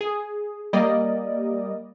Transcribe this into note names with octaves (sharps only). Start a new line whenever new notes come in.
G#4
G3 A#3 A#4 D5 D#5